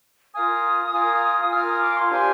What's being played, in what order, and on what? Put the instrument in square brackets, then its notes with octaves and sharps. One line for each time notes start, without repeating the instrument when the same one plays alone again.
[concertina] F4 A#4 F5 G#5 [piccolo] D#6
[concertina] F4 A#4 F5 G#5
[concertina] F4 A#4 F5 G#5 [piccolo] F6
[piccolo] D#6
D6
C6
[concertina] D4 G4 C5 F5 [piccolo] G#5